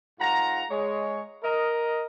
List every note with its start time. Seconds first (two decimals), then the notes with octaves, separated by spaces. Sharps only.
0.20 G#2 F4 F#5 A#5
0.70 G#3 C#5
1.43 A#4 D#5